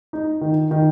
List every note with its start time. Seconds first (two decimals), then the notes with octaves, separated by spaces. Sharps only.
0.13 D#4
0.41 D#3
0.71 D#3